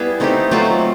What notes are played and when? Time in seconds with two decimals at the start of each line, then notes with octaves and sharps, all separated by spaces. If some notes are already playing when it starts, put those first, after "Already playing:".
Already playing: G3 B3 E4 G#4
0.20 A3 C4 D#4 G4
0.51 F#3 A3 C4 F4